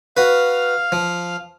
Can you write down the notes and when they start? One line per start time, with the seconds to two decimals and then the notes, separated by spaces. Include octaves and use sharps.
0.17 F#4 B4 F5 F6
0.92 F3